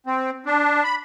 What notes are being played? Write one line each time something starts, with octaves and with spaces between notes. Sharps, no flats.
C4
D4
B5